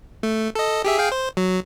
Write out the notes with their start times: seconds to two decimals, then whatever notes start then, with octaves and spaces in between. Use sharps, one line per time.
0.23 A3
0.55 A4 D#5
0.85 G4 G#4 E5
0.98 G#4 F5 G5
1.12 C5
1.37 F#3